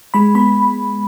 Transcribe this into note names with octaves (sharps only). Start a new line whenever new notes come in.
G#3 B5
B3 B5